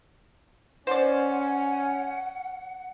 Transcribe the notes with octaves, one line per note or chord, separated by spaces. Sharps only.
C#4 C5 D5 F#5